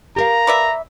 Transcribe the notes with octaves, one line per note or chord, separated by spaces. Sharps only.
G4 A#4 F5 A#5
B4 D5 E5